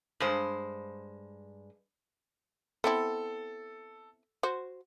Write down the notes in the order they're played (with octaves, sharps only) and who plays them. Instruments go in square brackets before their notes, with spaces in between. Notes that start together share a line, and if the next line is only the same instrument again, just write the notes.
[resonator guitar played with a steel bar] G2 G#3 C5
[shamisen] B3 C4 E4 [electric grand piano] A4
[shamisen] F#4 C5